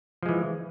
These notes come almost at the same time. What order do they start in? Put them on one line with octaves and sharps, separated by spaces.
F3 G#3 E3